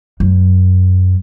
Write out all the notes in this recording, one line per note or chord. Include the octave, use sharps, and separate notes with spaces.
F#2